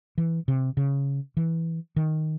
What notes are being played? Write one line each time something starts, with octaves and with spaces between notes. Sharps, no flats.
E3
C3
C#3
E3
D#3